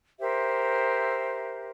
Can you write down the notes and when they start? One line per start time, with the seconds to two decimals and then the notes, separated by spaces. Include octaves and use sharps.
0.19 G4 A#4 C5 E5